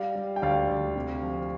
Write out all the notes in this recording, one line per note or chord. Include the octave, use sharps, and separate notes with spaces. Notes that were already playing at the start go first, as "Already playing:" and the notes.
Already playing: G3 D5 F5
G3
G5
D2 D5 F5
D2
C3
F3